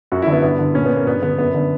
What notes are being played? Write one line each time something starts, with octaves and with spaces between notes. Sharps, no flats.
F#2 F#4
D3 E4
B3
G2 B3
D3
A#2 C#4
B3
A#3
G2 B3
D3 B3
F#2 B3
D3